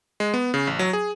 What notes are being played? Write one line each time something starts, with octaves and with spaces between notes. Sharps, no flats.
G#3
B3
C#3
A1
F#3
G#4